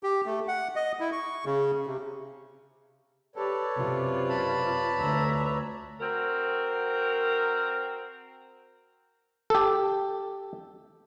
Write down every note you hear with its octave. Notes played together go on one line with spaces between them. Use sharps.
G4
A3
F#5
D#5
E4
C#6
C#3
C3
G4 A4 B4 C#5 D5
F#2 C3 F4
A5 B5
D2 E5 A#5
C4 F#4 A#4
G4 A4